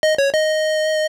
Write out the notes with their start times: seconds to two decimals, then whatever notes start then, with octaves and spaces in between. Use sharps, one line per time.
0.03 D#5
0.18 C#5
0.34 D#5